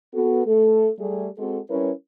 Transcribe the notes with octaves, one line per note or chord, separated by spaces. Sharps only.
B3 F#4 A4
A3 A4
G3 A3 G#4
G#3 C4 F#4 A4
G3 C#4 E4 A#4 B4 C#5